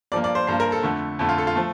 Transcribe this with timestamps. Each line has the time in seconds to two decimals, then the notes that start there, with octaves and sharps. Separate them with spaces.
0.12 G2 F3 A#3 D5
0.24 D5
0.35 C5
0.47 G2 F3 A#3 C5
0.60 A#4
0.72 A4
0.83 F2 D3 A3
1.19 F2 D3 A3
1.29 F4
1.38 A4
1.47 F4
1.55 F3 A3